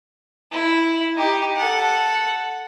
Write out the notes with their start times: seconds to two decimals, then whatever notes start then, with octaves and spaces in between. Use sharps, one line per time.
0.52 E4
1.16 D#4 G4
1.57 A4 F#5